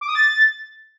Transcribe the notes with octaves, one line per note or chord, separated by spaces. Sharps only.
D6
D#6
A6